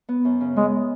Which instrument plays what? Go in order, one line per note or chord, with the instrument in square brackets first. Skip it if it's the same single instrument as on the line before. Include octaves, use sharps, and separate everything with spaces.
[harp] B3
F#2
C#3
[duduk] G#3 [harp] B3